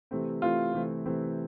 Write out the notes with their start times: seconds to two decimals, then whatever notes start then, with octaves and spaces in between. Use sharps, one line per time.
0.11 C3 E3 A3 C4
0.42 C3 E3 A3 C4 F4
0.74 C3 E3 A3 C4
1.06 C3 E3 A3 C4